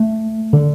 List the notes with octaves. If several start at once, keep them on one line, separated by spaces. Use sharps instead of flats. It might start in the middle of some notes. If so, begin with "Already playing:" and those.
Already playing: A3
D3